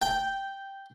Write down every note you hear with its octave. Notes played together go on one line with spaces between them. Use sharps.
G5